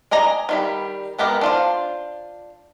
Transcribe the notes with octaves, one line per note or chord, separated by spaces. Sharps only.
D5 D#5 G#5 A#5
D#3 G3 B5
G#3 B3 G4 A#4
D4 F4 C5